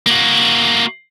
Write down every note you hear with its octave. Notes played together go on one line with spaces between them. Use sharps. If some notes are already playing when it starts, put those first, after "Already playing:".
A#3 F#4